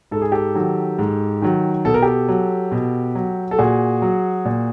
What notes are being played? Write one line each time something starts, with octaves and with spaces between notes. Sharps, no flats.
G#2 A4
G#4
G4 A4
D#3 F#3
G#2
D#3 F#3
B2 A4
A#4
G4 A4
F#3
B2
F#3
A4
A#2 F#4 G#4
F#3
A#2